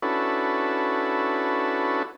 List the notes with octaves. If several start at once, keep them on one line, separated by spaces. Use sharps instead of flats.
C#4 D4 E4 F#4 A4 B4